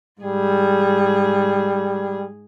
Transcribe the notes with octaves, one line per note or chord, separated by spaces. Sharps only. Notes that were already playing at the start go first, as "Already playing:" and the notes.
G#2 G3 G#4